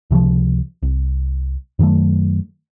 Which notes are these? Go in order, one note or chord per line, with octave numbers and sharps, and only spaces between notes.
C#2 C3 E3 F3
C2
F#2 D#3 F#3 A3